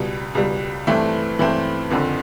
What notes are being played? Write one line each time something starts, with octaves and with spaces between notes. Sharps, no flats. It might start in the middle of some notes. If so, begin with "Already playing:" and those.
Already playing: C#2 B2 G3
C#2 B2 G3
G2 E3 A3 C4
G2 E3 A3 C4
F#1 F2 D3